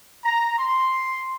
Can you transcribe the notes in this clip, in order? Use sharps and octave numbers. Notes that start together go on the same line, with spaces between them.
A#5
C6